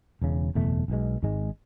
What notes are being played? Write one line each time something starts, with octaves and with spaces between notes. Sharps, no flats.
E1 E2 C#3
F#1 E2 B2 A3
B1 B2 G#3
G#1 G#2 G#3